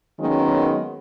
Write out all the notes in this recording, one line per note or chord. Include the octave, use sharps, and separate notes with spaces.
D#3 F#3 G#3 A#3 B3 C#4